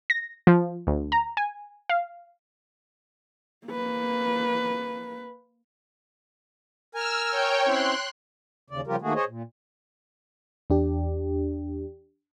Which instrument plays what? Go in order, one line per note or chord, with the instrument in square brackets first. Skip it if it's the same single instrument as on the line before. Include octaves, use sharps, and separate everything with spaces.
[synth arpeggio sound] A#6
F3
D2
A#5
G#5
F5
[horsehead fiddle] A#3 B4
[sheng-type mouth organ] A#4 G#5 [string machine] E6 F6
[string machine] C#5 G5
[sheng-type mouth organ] C4 C#4 E4 [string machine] C6 F#6
[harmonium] D#2 C#3 D5
C#3 F3 G3 F4 G4 A#4
D#3 A3 A#3 F#4 G#4
G#4 C5 C#5 D#5
A#2
[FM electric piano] E2 D4 G4